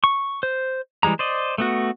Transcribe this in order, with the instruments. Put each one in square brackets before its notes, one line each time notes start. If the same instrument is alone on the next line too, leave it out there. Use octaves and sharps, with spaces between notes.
[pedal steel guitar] C#6
C5
E3 G3 G#3 A#5
C5 D5 D#5
A3 B3 F#4